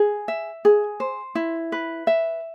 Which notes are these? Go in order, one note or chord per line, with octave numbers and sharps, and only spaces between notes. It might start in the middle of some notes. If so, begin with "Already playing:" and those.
Already playing: G#4
E5
G#4
C5
E4
B4
E5